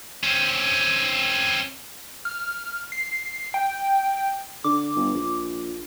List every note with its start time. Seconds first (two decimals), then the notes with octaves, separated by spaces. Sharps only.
0.24 C4 C#4
2.25 F6
2.92 C7
3.54 G5
4.64 D3 D6
4.96 G1
5.14 A#1